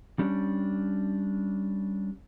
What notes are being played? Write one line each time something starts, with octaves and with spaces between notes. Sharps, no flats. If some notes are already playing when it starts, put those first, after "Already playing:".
G3 C#4 D4